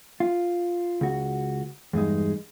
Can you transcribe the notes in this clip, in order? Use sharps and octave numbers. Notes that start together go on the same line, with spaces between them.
F4
C#2 F#4
E2 G2 G#3 D#4